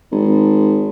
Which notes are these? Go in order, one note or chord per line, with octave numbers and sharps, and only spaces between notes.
G#1